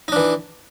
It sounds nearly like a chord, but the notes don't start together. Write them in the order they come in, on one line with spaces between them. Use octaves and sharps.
D#4 D4 E3